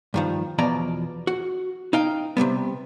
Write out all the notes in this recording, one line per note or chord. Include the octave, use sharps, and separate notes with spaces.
G2 D#3 F3
E2 B2 F3 D5 A#5
F#4
D#4 F5 G5
C3 D#3 G3 B3